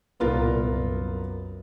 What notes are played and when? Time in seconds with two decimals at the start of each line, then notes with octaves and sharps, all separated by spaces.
0.20 C2 A#2 B3 F4 A#4
0.60 F#2